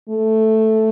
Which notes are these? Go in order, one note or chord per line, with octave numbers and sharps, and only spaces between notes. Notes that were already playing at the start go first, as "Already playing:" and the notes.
A3